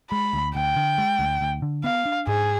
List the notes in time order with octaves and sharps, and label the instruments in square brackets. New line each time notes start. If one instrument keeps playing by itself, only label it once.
[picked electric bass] G#3 [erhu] B5
[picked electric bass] D2
[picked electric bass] D2 [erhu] G5
[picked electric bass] D3
G#3
D2
D2
D3
[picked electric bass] B3 [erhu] F5
[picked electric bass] D4
[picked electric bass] G#2 [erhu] G#4